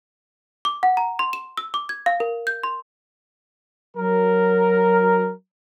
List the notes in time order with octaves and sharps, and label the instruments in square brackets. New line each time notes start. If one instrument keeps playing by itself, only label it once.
[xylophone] D6
F#5
A#5
C6
E7
E6
D6
G#6
F5
A#4
G6
C6
[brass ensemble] F#3 A#4